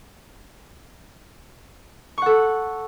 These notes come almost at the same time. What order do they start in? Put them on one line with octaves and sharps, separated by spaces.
C#6 F#5 A4